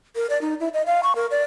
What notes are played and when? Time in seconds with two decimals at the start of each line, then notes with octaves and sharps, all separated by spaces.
0.15 A#4
0.30 D5
0.41 D#4
0.60 E4
0.73 D#5
0.86 F5
1.03 C#6
1.15 A#4
1.31 D5